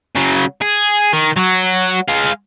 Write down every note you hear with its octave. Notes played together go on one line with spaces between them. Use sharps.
C#3 F#3
G#4
D#3
F#3 F#4
G#3 F5